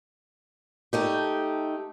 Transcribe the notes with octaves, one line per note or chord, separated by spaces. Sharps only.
A3 D#4 G4